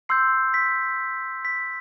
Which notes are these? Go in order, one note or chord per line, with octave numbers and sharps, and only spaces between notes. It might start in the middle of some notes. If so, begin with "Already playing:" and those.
C6 E6 G6 C7
B6
B6